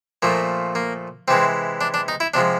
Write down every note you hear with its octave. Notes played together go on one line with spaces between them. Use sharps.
A#2 F3 A3 A#3
A#3
C3 E3 G#3 C4
D4
D4
D#4
E4
C3 F3 G#3 D4